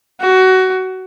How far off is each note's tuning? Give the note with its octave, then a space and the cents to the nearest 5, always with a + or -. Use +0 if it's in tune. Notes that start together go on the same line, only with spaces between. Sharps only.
F#4 +20